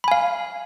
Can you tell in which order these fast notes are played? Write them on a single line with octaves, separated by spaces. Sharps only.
B5 G#5 F5